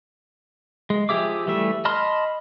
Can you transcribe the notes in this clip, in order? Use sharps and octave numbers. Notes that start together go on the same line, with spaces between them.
G#3
F3 G4 G#4 E5 D6
E3 G3 A3 E5
D#5 A5 B5 C6 F6